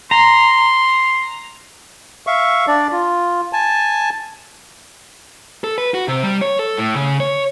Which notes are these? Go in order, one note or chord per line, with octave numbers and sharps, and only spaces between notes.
A#5 C6
E5 F5 C#6
D4 D5
F4
G#5 A5
A4
B4
F#4
C3
G3
C#5
A4
A2
C#3
C#5